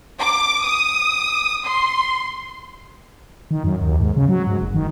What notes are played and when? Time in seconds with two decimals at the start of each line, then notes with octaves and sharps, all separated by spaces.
0.19 D6
0.63 D#6
1.65 C6
3.51 D#3
3.64 F#2
3.82 D#2
4.00 G#2
4.16 C#3
4.29 F#3
4.47 G#2
4.62 F#1
4.75 D#3